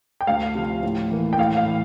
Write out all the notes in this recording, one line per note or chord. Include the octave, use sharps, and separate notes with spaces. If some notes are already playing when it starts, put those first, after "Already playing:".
G5
D2 F5
C3 F3
A2
E3 A#3
G5
A2 F5
F5
E3